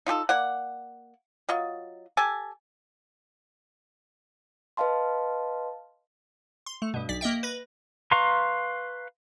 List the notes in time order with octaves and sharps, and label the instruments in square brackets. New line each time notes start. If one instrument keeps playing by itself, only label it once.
[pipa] D#4 F4 G4 A4
A#3 D5 F#5
F#3 F4 D#5
G4 A4 G#5 A5
[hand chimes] B4 D#5 F5 A5 C6
[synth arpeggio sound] C6
A3
G2 B2
B1 D5 B6
A#3 D#5 E5 G5
B4 A#6
[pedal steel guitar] B4 F5 A#5 C6 C#6